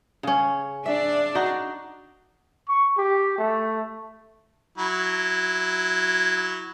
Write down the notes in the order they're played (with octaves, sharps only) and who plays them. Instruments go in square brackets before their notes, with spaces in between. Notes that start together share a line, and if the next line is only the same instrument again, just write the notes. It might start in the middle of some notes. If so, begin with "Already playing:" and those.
[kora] C#3 C#4
[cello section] D4 [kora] E5
[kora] D#4 F#4
[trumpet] C#6
G4
A3
[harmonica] F#3 E4